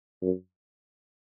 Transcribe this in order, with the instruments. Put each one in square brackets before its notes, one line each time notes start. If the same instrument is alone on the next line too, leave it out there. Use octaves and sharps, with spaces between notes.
[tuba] F#2